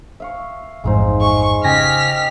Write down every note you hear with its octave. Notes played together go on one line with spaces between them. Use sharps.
E5 F5 C#6
A1 F2 G#2 G#3 D#4 C5
G#3 C#6
C#3 G4 D#5 G#5 F6 A#6 B6